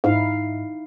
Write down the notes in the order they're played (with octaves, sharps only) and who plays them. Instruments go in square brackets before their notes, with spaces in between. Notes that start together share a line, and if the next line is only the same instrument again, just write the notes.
[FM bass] G#2 [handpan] D#4 E4 F5